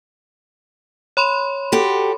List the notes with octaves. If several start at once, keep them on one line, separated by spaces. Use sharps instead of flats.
C#5 B5 C6
F#4 G4 A4